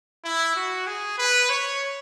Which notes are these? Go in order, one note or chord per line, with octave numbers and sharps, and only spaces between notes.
E4
F#4
G#4
B4
C#5